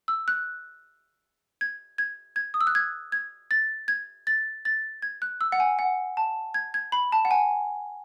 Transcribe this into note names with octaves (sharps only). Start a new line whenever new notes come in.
E6
F#6
G#6
G#6
G#6
D#6
E6
F#6
G#6
G#6
A6
G#6
A6
A6
G#6
F#6
E6
F#5
G#5
F#5
A5
G#6
G#6
B5
A5
F#5
G#5